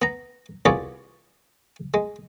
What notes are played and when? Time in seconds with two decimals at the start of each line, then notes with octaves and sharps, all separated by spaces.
0.02 B3 A#5
0.65 C2 B3 F4 G#4 C#5 D5
1.94 G#3